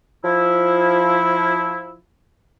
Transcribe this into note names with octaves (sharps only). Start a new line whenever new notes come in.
F3 E4